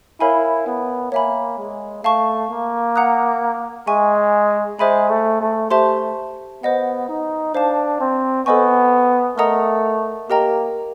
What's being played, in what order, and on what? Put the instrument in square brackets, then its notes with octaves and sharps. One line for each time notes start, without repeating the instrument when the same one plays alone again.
[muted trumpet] E4 [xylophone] A#4 C#5 F5 G#5 B5
[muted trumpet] B3
[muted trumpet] A#3 [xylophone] C#5 E5 G#5 B5
[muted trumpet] G#3
[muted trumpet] A3 [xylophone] F5 A5 C#6
[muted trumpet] A#3
[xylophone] F#5 A#5 D#6 F#6
[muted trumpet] G#3 [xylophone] E5 G#5 C#6
[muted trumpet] G#3 [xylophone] C5 E5 G#5 B5
[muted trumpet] A3
A3
[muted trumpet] A3 [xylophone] G4 C5 E5 A5 C6
[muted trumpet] B3 [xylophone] C5 D#5 F#5
[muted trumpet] D#4
[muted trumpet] D4 [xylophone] C5 F5 A5
[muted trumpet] C4
[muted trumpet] B3 [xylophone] A4 C5 D#5 G#5 C#6
[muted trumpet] A3 [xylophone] A#4 D#5 F#5 A#5 D#6
[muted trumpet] A#3 [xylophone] G4 A#4 D#5 G5 A#5